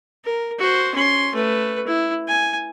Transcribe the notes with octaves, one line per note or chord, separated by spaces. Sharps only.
A#4
F#4 C5
C#4 C6
A3 B4
E4
G#5